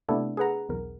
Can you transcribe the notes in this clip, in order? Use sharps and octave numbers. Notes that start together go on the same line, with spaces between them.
C3 A3 B3 D4 E4 A4
G#4 A4 B4 F#5 A#5
B1 E2 A#4